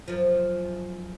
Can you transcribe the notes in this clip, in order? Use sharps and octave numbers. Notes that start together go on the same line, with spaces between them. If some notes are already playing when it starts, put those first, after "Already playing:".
F#2 F3